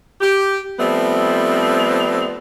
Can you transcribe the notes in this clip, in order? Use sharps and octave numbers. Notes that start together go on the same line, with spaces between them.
G4
F3 G3 A3 B3 C4